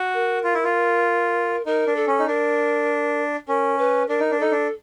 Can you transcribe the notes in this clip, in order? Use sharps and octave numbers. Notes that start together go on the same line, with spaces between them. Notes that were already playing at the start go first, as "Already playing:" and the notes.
Already playing: F#4
A#4
F4
E4
F4
D#4 A#4
D4
A4
C#4
D#4
D4 A#4
C#4 A#4
B4
D4 A#4
D#4
D4
D#4 A4
D4